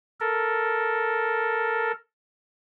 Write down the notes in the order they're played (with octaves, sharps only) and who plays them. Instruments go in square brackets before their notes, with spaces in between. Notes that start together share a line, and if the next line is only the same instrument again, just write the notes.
[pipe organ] A4 A#4